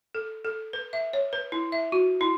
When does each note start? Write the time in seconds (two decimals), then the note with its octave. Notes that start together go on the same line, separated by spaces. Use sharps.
0.15 A4
0.45 A4
0.73 B4
0.93 E5
1.13 C#5
1.33 B4
1.52 E4
1.72 E5
1.92 F#4
2.21 E4